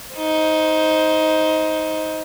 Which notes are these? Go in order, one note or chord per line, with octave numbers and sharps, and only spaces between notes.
D#4 C5